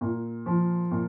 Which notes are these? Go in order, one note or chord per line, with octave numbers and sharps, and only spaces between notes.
A#2
F3
A#2